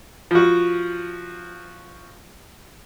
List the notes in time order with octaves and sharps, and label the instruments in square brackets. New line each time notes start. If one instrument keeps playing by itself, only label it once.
[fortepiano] F3 F#4 [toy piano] F4